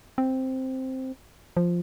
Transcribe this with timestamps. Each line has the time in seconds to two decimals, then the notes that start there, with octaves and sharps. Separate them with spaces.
0.18 C4
1.57 F3